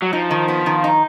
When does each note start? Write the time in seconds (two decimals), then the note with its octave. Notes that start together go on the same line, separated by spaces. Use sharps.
0.02 F#3
0.13 F3 D#4
0.31 D#3
0.48 B3
0.66 D#3
0.84 D#4